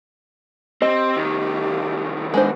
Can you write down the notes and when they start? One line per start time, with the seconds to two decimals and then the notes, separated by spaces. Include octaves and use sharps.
0.82 C4 G4 D#5
1.16 C2 D#3
2.34 G#3 B3 D4 C5